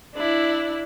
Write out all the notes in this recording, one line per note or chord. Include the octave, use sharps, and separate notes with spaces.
D4 E4